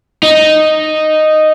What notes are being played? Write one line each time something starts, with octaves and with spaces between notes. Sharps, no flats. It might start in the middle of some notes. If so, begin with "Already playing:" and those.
D#4